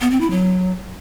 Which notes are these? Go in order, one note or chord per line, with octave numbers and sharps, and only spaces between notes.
B3
C4
E4
F#3